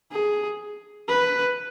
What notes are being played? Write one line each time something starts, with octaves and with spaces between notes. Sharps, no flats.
G#4
B4